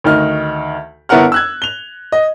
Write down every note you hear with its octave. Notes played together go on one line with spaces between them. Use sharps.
D2 D#3 D#4 F6
G1 B3 E4 A#4 F#5 F6
E6 F#6 G#6
F7 G7
D#5